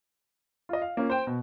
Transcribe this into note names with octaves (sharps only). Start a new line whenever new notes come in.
F4 D#5
F5
A#3 C#4 F4
C5 G5
B2